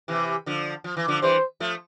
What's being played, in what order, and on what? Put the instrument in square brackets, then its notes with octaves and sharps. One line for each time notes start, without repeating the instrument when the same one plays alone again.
[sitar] C3 E3
D3 F3
F3
E3
D3 F3
[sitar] E3 G3 [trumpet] C5
[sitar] F3 A3